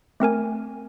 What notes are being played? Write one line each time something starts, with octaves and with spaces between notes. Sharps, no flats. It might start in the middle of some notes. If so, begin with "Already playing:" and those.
A3 C4 A#4 G#5